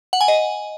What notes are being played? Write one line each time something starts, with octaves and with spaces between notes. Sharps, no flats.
F#5
G#5
D#5